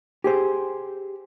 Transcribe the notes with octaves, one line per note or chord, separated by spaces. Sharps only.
G4 G#4 C5